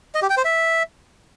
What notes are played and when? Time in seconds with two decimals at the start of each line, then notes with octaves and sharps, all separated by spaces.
0.15 D#5
0.22 G4
0.30 G5
0.37 C5
0.45 E5